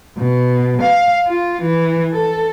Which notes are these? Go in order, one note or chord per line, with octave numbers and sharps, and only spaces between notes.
B2
F5
F4
E3
A4